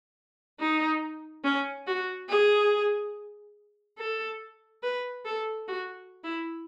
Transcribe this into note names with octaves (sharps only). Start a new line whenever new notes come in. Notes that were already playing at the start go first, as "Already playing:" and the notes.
D#4
C#4
F#4
G#4
A4
B4
A4
F#4
E4